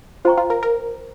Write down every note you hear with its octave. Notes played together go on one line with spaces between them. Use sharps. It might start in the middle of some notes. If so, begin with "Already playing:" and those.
F4 C5 G5 A#5 C#6
F4
A#4
A#4